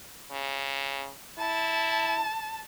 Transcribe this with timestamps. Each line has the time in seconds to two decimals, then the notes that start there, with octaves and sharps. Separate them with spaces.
0.31 C#3
1.38 E4 A5